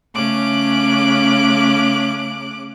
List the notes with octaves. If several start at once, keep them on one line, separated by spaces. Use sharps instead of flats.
C#3 A3 C#4 D6 F#6